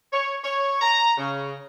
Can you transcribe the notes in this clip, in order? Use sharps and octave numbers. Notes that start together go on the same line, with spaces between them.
C#5
C#5
A#5
C#3